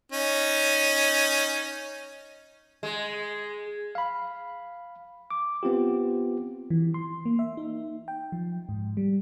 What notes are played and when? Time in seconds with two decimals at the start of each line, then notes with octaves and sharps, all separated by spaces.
0.12 C#4 D#4
2.83 G#3
3.95 F5 B5
5.31 D6
5.63 B3 C4 F4 G4
6.70 E3
6.94 C6
7.25 A#3
7.39 E5
7.57 D#4
8.08 G5
8.32 F3
8.69 G#2
8.97 G3